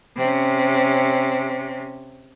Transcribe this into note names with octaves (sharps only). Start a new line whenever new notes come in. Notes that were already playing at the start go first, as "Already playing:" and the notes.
C3 C#4